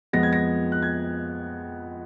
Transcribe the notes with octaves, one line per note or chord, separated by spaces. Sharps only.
F2 F3 G#3 B3 A#6
G#6
A#6
F#6
G#6